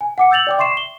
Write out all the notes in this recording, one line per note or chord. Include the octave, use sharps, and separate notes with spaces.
G#5
F#5 D6 C#7
E6 G6 A6 F7 F#7
D5 G5 D6
E5 C6 C#6 C7 E7
G7